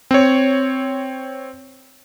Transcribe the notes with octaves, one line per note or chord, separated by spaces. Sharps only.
C4 C#5